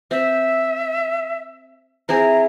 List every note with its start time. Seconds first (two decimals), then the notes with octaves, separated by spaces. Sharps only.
0.11 C4 E5
2.09 C4 E4 G#4 A#5